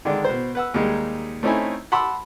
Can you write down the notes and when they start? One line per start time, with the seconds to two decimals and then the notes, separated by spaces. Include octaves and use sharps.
0.05 D3 D#3 G#3 D4
0.25 B2 C5
0.55 B4 F#5 E6
0.74 D#2 G3 G#3 D#4
1.43 A3 C4 C#4 D#4 E4 G#5
1.92 F#5 A5 B5 C6 D6 E6